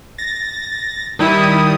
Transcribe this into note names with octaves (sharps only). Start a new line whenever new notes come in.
A6 A#6
D#3 G3 E4 D#6